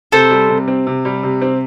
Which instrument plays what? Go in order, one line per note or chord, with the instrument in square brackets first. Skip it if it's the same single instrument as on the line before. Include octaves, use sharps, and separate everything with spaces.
[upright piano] C3 [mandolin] A4 C5
[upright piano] G3
C3
C4
C3
G3
C3
C4